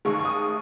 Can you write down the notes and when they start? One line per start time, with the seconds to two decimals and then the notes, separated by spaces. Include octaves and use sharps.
0.05 D#2 D#3 G#3 C#6
0.19 C#6
0.25 D#6